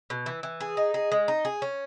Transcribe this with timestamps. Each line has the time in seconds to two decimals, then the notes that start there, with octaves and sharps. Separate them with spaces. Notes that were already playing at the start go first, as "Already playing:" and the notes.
0.10 B2
0.26 E3
0.43 E3
0.60 G#4
0.77 D#4
0.94 G#4
1.12 G#3
1.28 D#4
1.45 G#4
1.62 C#4